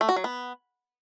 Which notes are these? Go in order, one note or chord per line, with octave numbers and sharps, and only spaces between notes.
A3
F#4
F#3
B3